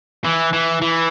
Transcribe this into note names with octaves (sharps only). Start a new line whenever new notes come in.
E3
E3
E3